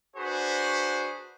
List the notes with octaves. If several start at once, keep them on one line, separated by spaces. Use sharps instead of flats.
D4 F#4 G#4 B4 C5